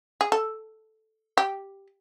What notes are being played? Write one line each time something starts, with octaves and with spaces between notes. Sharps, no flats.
G#4
A4
G4